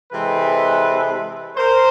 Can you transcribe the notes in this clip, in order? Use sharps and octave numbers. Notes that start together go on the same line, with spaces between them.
C3 E3 G#3 C4 A4 B4
A#4 C5